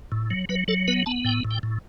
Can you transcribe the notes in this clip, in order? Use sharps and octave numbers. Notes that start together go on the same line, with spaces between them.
A2
F#3
F#3 B4
F#3 A4
B3 B4
B3 A5
A2 G5
A2
G5
A2